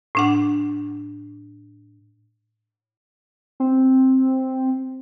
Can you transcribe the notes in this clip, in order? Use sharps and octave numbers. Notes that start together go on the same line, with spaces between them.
A2 D4 F#5
C4